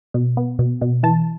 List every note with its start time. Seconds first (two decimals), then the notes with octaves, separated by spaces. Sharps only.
0.14 B2
0.37 B3
0.59 B2
0.81 B2
1.03 E3 A5